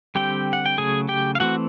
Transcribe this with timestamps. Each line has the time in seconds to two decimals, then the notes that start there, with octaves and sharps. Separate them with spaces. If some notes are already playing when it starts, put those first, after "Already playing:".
0.15 D3 G3 C4 G4 G5
0.53 F#5
0.66 G5
0.78 C#3 F#3 A3 G#4 G#5
1.09 G4 G5
1.35 F5
1.40 E3 A3 C4 F#4 F#5